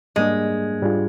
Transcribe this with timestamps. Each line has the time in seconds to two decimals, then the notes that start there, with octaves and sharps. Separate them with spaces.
0.16 G#2 G3 G#3 A#3 D4
0.82 G#2 G3 D4 F4 G#4